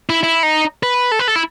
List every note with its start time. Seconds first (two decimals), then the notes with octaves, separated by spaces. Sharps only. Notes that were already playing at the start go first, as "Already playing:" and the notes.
0.10 E4
0.23 E4
0.43 D#4
0.83 B4
1.12 A4
1.19 B4
1.28 A4
1.36 E4